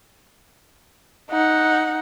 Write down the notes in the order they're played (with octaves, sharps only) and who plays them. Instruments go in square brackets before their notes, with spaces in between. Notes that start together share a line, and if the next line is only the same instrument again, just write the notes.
[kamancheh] D#4 F#5